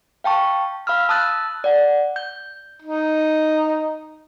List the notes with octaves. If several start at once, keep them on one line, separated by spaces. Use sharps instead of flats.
F5 G5 A5 C#6
F5 B5 E6 F6
A5 D#6 E6 F#6 A6
D5 F#5
G6
D#4